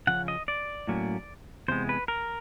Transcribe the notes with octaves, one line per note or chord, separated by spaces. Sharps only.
C#3 F3 C#4 F#5
D#5
D5
A2 F#3 A#3 C#4
E2 C3 G#3 B3 C5
B4
A#4